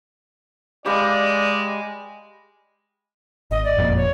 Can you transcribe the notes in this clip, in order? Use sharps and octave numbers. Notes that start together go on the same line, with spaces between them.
G#3 G4 B4 D5 F5
G#1 D#5
D5
F#1 F2 A#2
C#5